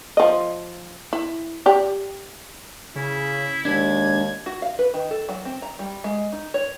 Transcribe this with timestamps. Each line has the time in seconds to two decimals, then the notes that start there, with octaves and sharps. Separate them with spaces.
0.17 F3 D#5
1.13 E4
1.66 G4 D5
2.96 C#3 E4
3.65 D#2 G#3 D4 G#6
4.46 F#4
4.62 F5
4.79 B4
4.94 D#3
5.11 A4
5.29 F#3
5.45 C4
5.62 A#5
5.79 G3
6.04 G#3
6.32 D#4
6.54 C#5